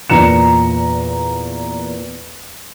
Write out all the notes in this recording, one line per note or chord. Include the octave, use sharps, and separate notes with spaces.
E2 A#2 A#5 C#7 E7